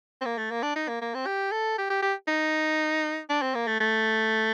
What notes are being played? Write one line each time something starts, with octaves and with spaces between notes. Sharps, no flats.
C4
A#3
A3
A#3
D4
D#4
A#3
A#3
C4
G4
A4
G4
G4
G4
D#4
D4
C4
A#3
A3
A3